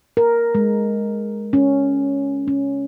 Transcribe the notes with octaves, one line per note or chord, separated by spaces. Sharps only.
A#4
G#3
C#4
C#4